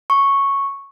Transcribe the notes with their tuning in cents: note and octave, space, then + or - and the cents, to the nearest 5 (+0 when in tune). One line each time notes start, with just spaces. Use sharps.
C#6 -5